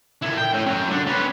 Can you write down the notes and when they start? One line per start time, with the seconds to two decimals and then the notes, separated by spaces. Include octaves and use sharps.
0.23 A#2 E4
0.38 G5
0.54 A2
0.66 F#3 C#4
0.90 D3 D4
1.07 C#4 B4